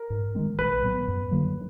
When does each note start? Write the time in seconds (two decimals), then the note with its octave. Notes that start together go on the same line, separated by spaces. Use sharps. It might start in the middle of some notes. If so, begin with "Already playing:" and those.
Already playing: A#4
0.10 G#2
0.35 D#3 G#3 C4
0.58 A#1 B4
0.82 A2 F#3 B3
1.08 F#2
1.31 D3 F#3 A#3